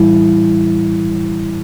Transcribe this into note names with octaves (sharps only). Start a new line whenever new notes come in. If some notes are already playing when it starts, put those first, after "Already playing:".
Already playing: A2 E3 G3 E4